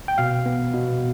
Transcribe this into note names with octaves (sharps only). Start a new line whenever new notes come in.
G5
B2 F5
B3
B2